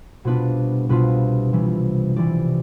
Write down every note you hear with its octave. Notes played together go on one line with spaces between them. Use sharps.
C2 B2 B3 D4 F4 B4
C2 B2 B3 D4 F4 B4
C2 C3 E3 G3
C2 C3 E3 G3 D5